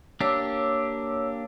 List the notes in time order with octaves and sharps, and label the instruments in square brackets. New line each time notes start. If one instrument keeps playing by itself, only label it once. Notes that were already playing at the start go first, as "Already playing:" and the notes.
[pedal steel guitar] A#3 D4 G4 [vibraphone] C#5 D6 E6